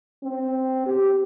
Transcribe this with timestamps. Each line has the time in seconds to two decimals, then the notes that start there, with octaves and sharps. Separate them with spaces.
0.24 C4
0.86 G4